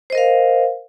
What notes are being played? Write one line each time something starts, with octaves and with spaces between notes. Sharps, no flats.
A#4 C5 D#5 F5